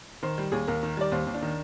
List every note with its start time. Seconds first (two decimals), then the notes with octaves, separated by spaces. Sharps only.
0.23 D#3 C5
0.38 G3
0.52 D#2 G#4
0.67 D#2 A#4
0.83 D#3
0.97 G3 D5
1.12 D#2 C5
1.27 D#2
1.34 D4
1.42 D#3